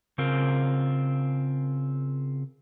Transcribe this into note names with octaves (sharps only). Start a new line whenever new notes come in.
C#3 C4 F4 A#4